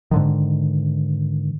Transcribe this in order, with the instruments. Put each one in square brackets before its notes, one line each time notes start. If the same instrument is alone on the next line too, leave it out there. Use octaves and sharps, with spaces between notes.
[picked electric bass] G#2 D3 D#3